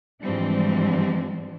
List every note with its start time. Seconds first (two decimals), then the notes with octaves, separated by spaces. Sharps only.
0.23 G#2 E3 F3 G3 C4 D4